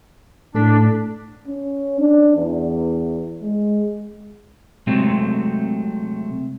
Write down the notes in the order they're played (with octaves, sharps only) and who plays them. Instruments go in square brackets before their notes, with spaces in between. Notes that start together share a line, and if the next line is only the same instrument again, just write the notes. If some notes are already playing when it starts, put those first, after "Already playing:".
[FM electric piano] A2 A4 B6 [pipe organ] D4
[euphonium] C#4
D4
E2
G#3
[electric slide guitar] C3 F#3 G#3 A3 C4